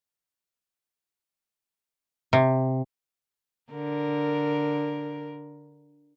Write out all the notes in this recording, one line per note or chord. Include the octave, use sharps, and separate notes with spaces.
C3
D3 A#4